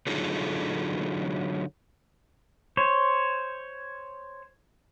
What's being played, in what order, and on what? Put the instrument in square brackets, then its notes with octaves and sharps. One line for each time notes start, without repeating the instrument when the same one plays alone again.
[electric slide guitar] D3 F#3 D#4 F4 G#4 A4
[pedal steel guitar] C5 C#5